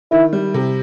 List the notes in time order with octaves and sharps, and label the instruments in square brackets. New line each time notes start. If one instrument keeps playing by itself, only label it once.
[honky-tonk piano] D#3 [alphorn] E4
[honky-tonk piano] G3
C3